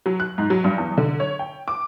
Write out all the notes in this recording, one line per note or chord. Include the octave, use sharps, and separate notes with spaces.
F#3
F#6
G#2
F#3
G2
E2
D3
C#5
G5
D6